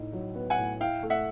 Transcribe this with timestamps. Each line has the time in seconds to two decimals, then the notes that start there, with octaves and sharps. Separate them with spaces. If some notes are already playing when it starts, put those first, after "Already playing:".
Already playing: A2 D#4
0.13 F#3
0.35 B3
0.50 F#5 G#5
0.58 A2
0.80 E4 F5 G5
1.03 A3
1.10 E5 F#5